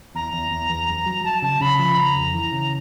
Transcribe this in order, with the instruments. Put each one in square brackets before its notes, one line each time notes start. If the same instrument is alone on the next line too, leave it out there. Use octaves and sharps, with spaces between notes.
[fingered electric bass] E2 [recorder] A#5
[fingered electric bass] E2
E2
E2
F#2
F#3
[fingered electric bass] F#3 [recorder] A5
[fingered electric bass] C#3 [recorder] A5
[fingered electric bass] C#3 [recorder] B5
[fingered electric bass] F3
[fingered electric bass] C#3 [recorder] A#5
[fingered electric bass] F2
E3
C#3